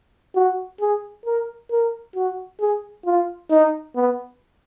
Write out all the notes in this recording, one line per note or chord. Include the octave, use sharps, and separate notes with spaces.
F#4
G#4
A#4
A#4
F#4
G#4
F4
D#4
B3